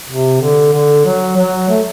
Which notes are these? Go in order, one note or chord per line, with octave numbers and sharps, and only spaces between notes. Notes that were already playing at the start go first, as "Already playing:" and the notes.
C3
D3
D3
F#3
F#3
A3